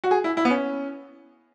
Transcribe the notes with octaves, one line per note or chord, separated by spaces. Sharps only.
F#4
G#4
E4
E4
B3
C#4